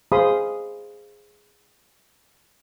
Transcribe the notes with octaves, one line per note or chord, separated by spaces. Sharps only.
G#4 C5 F5 B5 C6 D#6